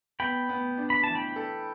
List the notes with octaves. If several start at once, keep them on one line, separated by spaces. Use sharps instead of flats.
B3 G5 B5
B3
D4
B5
E3 A5
G5 B5
A4